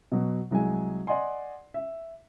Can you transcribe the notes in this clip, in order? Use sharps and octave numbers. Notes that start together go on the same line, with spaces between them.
B2 F#3
C2 F#3 G#3 G#5
D5 D#5 F#5 G#5 C6
E5